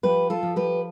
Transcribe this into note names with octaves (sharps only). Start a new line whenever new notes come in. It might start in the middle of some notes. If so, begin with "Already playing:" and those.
F3 G4 B4
F4 A4
F3
G4 B4